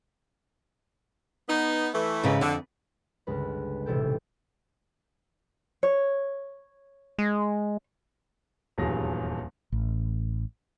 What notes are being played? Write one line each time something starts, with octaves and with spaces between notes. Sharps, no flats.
B3 D#4
E3 A3
G#2 C#3 B4
F2 D3
G1 C#2 G#3 B4
D#1 A1 C3 A4 G5
C#5
G#3
D#1 E2 G2 F#3 G#4 A#6
A1